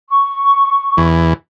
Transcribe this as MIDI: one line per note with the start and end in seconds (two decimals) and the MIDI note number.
0.10 1.05 85
0.97 1.33 40